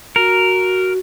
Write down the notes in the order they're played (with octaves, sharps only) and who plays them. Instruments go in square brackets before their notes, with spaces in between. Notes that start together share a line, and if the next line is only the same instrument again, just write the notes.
[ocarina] F#4 [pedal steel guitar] A#4